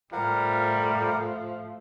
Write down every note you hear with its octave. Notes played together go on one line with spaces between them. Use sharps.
A2 F3 G3 A3 A#4 F5 F#5